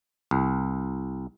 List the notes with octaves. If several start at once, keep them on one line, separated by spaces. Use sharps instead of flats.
C2